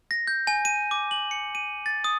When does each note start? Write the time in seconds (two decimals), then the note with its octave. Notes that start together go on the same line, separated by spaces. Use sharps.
0.11 A#6
0.27 G6
0.47 G#5
0.65 D#7
0.91 D6
1.11 F#7
1.31 C#7
1.55 D#7
1.86 A6
2.04 D#6